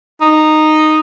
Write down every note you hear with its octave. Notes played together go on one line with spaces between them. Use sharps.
D#4